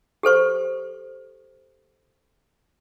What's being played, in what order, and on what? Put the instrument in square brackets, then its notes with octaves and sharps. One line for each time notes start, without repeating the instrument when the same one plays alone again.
[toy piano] G4 A4 C5 C#6